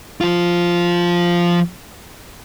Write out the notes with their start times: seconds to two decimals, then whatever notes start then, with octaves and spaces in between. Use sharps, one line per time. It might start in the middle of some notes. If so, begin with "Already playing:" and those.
0.21 F3 F4